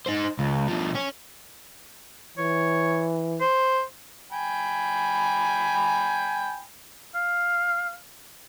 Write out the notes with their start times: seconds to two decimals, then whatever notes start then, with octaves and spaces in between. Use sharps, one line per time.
0.06 D#4 C5
0.39 C#2
0.68 B2 F3
0.96 C#5 G#5
2.38 E3 C#5
3.41 C5
4.32 G5 G#5 B5
7.15 F5